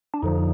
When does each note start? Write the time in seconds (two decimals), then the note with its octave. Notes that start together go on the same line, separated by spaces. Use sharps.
0.14 D4
0.22 F2 D3 F3 D#4